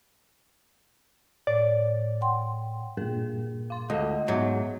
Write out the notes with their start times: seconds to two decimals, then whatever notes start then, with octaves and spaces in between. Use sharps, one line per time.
1.47 A2 C#5 D5
2.21 F#5 G5 C6
2.97 G2 A#2 G#4 A#4
3.70 F5 C6
3.90 D2 G#3 A4 D#5 F5
4.28 G#2 F#3 B3 C#5 E5